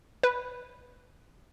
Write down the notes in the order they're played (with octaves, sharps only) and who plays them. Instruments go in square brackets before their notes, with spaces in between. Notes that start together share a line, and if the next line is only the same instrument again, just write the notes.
[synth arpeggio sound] B4